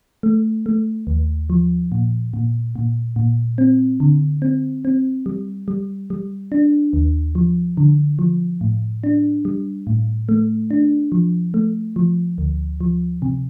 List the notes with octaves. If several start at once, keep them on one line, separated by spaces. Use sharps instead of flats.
A3
A3
D#2
F3
A#2
A#2
A#2
A#2
C4
D3
C4
C4
G3
G3
G3
D4
D#2
F3
D3
F3
A2
D4
G3
A2
A3
D4
F3
A3
F3
D2
F3
C3